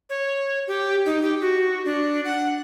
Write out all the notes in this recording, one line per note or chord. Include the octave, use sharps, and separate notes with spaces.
C#5
G4
D#4
G4
F#4
D4
F#5